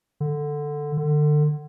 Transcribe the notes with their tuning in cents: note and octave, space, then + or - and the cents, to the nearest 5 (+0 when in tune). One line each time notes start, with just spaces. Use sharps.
D3 +5
D3 +30